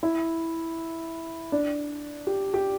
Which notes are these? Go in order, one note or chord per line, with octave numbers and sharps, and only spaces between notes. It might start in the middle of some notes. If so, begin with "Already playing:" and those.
E4
D4
G4
G4